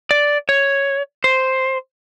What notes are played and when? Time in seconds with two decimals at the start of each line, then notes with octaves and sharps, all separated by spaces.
0.11 D5
0.49 C#5
1.24 C5